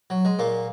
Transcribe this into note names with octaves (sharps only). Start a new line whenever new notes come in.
F#3
G#3
A#2 A#3